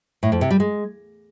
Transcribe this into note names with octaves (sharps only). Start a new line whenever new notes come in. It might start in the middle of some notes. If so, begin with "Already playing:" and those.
A2
F2
C3
G3
G#3